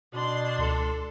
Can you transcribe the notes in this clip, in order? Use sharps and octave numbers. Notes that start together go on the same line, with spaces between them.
B2 D4 C6
C#2 A4